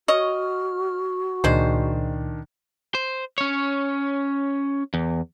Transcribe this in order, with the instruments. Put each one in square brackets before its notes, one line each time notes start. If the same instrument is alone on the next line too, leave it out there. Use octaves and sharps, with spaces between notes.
[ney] F#4 [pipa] C#5 D#5 [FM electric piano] F6
[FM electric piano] C#2 A#2 [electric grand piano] D#3 D4 [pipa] G#3 C5
[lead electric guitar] C5
C#4 C#5
E2